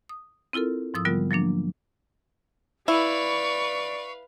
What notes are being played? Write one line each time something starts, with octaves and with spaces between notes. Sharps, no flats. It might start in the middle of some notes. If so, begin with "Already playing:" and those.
D#6
C4 E4 F4 A4 A#4
G#2 F3 D#6 E6
D3 F#3 G3 B3 F4 A#4
F3 F#3 A#3 D4
E4 B4 D5 F5 C#6